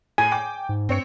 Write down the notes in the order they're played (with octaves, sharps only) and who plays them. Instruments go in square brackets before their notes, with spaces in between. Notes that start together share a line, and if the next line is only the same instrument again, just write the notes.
[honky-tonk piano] A2 [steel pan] G#5
[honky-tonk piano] G5 D6
[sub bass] G#2
[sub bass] G2 [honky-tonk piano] C4 C#5 C#7